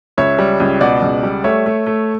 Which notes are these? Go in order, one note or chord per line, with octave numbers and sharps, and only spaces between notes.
C#2 C#5 E5
G3
C#2
B2 D5 F#5
C#2
G3
A3 C#5 E5
A3
A3